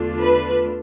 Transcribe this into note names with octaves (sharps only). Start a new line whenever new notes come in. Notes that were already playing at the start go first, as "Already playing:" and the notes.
Already playing: E2 D3 A3 D4 F4
B4